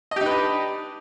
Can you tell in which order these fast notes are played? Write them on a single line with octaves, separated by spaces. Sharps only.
D#5 G4 D#4 B4 D4